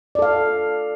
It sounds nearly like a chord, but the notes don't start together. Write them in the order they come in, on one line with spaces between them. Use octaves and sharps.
D5 A4 F5